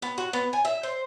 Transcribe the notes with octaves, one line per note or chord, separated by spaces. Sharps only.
B3
F#4
B3
G#5
E5
C5